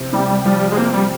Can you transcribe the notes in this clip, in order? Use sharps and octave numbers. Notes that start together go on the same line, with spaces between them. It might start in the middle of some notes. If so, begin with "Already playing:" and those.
Already playing: C3 F3 C4
C3 G3
F3 G3
G#3
A#3 C4
G3